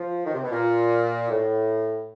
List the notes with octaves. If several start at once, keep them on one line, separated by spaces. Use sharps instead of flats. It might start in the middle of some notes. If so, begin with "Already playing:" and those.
Already playing: F3
D#3
C3
B2
A#2
A2